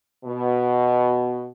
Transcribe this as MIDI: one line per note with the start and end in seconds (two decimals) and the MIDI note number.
0.25 1.46 47